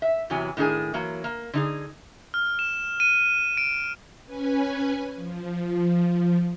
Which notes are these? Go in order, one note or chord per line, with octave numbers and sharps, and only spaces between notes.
E5
E2 C3 E3 F#3 G#5
A2 D#3 D4 G#4 G#5
E3 F#3 A#3
A#3
D3 D#4 G#4
F6
E7
D#7
D7
C#4 B4 G#5
F3